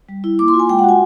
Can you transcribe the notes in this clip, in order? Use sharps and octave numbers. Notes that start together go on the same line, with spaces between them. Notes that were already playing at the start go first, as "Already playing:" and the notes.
G3
E4
A#3 D6
C6
F4
G#5
G#3 G5
F#5
F#4 G#5